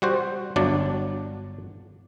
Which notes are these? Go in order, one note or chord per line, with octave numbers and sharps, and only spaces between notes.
G3 F#4 C5
G1 F#3 D4 D5